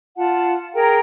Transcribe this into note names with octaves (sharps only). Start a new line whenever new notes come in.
F4 F#5 A5
G#4 A#4 G5 A#5